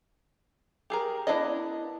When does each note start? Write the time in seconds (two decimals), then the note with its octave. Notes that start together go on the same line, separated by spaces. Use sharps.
0.90 G4 G#4 A#4
1.27 B3 D4 E4 D5 D#5